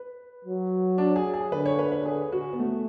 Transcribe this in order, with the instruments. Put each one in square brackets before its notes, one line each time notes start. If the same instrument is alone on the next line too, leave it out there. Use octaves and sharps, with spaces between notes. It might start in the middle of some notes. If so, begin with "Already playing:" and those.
Already playing: [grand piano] B4
[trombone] F#3
[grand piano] D4
G#4
G#4
[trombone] D3 [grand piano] B4
[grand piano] C#5
B4
B4
G#4
F#4
B3
A3